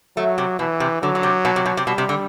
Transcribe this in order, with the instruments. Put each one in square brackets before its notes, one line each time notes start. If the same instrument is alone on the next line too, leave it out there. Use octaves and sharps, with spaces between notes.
[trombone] F#3 [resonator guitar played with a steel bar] A3
[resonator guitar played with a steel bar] C3
[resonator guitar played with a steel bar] B2 [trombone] E3
[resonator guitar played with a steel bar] C3
[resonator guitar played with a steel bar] D3 [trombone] F#3
[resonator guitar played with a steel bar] D3
C3
B2
C3
B2
C3
[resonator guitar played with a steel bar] B2 [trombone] G3
[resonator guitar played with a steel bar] C3
D3